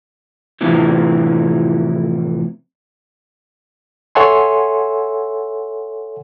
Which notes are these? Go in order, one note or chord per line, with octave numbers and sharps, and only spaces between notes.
F2 A2 C3 E3 F3
A4 C#5 E5 F#5 G#5 C6